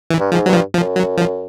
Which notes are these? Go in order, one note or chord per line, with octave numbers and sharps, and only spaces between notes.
E3
G2
G#2 F3
G2 F#3
F3
F3
F#2
F#3
F3